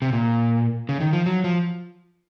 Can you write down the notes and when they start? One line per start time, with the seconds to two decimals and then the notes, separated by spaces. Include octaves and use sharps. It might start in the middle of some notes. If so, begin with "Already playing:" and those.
0.02 C3
0.13 A#2
0.89 C#3
1.00 D#3
1.13 F3
1.26 F#3
1.44 F3